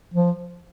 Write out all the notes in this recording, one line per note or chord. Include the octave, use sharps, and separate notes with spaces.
F3